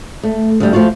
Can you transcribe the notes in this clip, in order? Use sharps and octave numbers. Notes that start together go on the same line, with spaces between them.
A3
D2 G3
F3 A3 F4 F#4